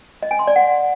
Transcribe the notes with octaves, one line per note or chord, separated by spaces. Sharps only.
D#5
G#5
C6
D5
F#5